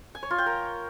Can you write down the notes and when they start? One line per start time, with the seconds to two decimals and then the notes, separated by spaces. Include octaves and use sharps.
0.15 G#5
0.23 C#5
0.31 F4
0.38 G5
0.46 A#4